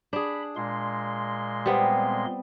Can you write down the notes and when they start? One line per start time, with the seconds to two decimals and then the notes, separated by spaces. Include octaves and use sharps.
0.13 D4 G#4 B5
0.56 A#2 G#3 C6
1.66 G3 B3 C4